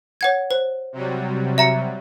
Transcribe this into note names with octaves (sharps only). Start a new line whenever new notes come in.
C#5 F#5 G#6
C5
C3 F#3 G3
E5 A#5 C#7